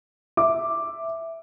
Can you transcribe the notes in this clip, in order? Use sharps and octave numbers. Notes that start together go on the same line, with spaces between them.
E5 D6